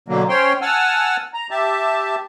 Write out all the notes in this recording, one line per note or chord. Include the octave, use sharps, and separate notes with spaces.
B2 D3 F#3 A#3
C#4 C5 C#5 G5 C6
F#5 G#5 A5 E6 F6
A#5
G4 E5 A5